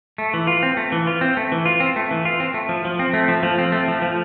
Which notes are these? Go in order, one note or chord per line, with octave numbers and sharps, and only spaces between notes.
A3
E3
F4
C4
A3
E3
F4
C4
A3
E3
F4
C4
A3
E3
F4
C4
A3
F3
F3
C4
A3
F3
F3
C4
A3
F3
F3